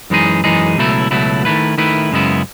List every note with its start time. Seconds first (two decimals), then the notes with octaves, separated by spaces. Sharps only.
0.10 F#2 E3 G#3 D#4 G#4
0.44 F#2 E3 G#3 D#4 G#4
0.77 C#2 B2 F#3 A3 E4
1.11 C#2 B2 F#3 A3 E4
1.45 D#3 A3 E4 B4
1.78 D#3 A3 E4 B4
2.12 F#2 C#3 G#3 B3 E4